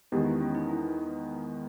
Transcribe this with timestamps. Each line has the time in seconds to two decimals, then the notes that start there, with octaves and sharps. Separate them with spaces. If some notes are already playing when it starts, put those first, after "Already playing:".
0.12 E2 D#3 G#3 B3 G4
0.26 E4
0.41 C#4
0.55 D#4
0.69 E4